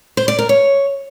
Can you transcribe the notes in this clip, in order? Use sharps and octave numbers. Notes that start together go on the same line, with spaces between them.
C5
D5
A#4
C#5